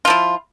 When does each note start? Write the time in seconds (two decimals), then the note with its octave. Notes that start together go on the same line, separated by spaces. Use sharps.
0.05 F4
0.07 F3
0.10 E4